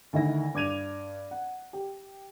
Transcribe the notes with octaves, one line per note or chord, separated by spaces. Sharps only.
D2 D#3 E4 A#6
G2 D6 G#6 D#7 F7
F#5
G4